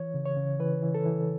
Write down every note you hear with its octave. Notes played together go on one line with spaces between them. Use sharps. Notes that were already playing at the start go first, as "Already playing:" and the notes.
Already playing: E3 C#5
C#3
C#5
C#3
E3 B4
E3
A4
E3